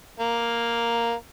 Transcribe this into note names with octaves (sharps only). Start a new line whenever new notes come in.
A#3